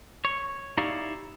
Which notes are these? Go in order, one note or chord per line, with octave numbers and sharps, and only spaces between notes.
C#5
D#4 E4 G4 C#5 D5 F5